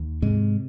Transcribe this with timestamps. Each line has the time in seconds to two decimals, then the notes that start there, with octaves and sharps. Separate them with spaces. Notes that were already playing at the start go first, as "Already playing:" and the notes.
Already playing: D#2
0.22 G#2 C3 G#3